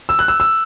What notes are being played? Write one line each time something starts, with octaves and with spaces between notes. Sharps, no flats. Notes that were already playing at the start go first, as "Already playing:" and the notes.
E6
F#6
E6
E6